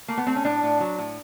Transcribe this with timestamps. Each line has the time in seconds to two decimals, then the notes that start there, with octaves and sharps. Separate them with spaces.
0.08 A3 A#3
0.18 B3
0.26 A3 C4
0.36 C#4
0.45 A2 D4
0.63 A2
0.80 F#3
0.98 A2